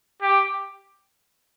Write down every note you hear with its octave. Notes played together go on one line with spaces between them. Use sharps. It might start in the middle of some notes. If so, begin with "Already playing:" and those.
G4